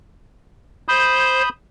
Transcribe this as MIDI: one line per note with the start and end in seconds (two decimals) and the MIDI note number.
0.88 1.42 72
0.88 1.49 83
0.88 1.49 87
0.88 1.49 91